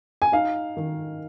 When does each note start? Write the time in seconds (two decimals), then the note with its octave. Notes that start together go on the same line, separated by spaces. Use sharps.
0.22 G#5
0.32 D#4 F5
0.77 D#3